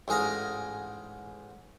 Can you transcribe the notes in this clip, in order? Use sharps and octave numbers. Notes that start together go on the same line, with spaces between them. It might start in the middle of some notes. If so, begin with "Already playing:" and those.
A1 G#2 G#4 F5 A#5